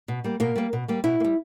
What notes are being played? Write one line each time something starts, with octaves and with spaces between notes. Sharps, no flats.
B2
G3 A#3
B2 A#3 A#4
G3 A#3
B2
G3 A#3
B2 E4
A#3
G3